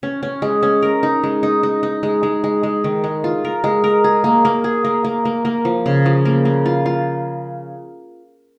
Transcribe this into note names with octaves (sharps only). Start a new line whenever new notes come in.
C#4
C#4
G#3
C#4
A#4
D#4
G#3
D#4
D#4
D#4
G#3
G#3
G#3
G#3
D#3
G#3
F4
A#4
G#3
A#4
G#4
A#3
A#3
G#4
A#3
A#3
A#3
A#3
F3
C#3
F3
A#3
A#3
F4
F4